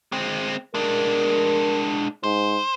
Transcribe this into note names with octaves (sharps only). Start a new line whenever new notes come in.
G#3 C4
G#3 D4 A#4
G#2 C5